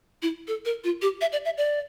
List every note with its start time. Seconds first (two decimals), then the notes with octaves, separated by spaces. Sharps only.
0.22 E4
0.48 A4
0.65 A#4
0.84 F4
1.02 G4
1.21 E5
1.32 D5
1.45 E5
1.58 D5